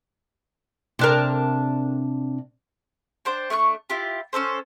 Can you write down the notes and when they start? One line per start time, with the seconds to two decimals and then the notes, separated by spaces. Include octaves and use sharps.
0.99 C3 D4 A#4
3.25 D4 C5 G5 A5
3.50 A3 D4 G5 C#6
3.90 E4 F4 G4
4.33 C#4 F#4 A4 C5